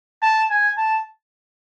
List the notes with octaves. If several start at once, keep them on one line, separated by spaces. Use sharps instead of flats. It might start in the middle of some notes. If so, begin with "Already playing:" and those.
A5
G#5
A5